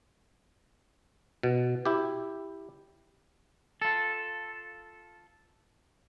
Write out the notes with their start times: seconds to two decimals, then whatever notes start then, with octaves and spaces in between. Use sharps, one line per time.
1.43 B2
1.85 E4 G4
3.82 F4 A4